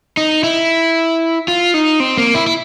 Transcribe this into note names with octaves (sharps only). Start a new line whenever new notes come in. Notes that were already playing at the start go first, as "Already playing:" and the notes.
D#4
E4
F4
D#4
C4
A#3
E4
E4